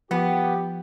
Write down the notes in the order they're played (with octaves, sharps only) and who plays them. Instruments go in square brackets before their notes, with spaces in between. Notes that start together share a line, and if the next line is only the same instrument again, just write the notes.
[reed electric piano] F3 [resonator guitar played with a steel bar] B3 [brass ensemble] G4